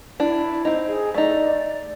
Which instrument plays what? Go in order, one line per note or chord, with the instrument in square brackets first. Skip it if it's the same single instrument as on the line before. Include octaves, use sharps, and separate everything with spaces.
[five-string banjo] D4 [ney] E4
[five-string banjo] C4 D#4
[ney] G#4
[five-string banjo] A3 D#4 [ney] D5